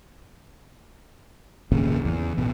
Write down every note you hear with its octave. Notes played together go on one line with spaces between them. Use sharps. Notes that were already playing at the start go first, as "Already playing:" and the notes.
G#1 D#2 A#2 C#3
E2
A1 B2